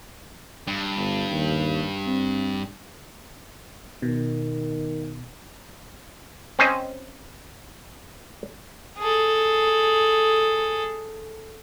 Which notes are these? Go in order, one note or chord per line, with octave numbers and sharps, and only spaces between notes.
G2
G1
D#2
C4
B2 D#3
C4 C#4 C5 D#5
G#4 A4